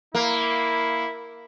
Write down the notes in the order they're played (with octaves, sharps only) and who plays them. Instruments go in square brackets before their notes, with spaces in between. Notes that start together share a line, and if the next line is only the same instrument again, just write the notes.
[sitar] A#3 [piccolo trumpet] E4